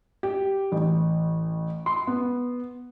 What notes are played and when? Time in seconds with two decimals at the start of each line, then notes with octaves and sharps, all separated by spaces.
0.23 G4
0.72 A1
1.86 C6
2.07 B3